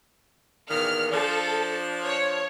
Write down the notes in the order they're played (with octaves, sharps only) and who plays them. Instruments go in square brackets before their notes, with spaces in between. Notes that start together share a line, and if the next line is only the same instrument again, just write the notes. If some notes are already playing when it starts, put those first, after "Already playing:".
[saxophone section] E2 A#2 D#3 [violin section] F6
[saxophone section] F3 D4 [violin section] A4
[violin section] C#5